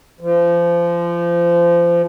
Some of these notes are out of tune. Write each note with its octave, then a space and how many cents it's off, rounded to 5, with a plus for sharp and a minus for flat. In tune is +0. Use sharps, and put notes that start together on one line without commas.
F3 -25